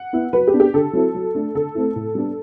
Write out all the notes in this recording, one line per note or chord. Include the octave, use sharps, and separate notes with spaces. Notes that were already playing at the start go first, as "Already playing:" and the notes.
Already playing: F#5
B3 E4
F#3 B4
G4
B3 D4
G4
D3 A4
F#3 C4 E4
F#3
A3 D4
D3 A4
A3 C4 E4
A2
G3 B3 D4